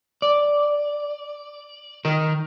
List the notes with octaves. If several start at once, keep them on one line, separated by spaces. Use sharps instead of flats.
D5
D#3 A#4